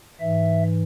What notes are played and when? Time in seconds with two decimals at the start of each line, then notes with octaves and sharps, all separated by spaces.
0.20 G#2 E3 E5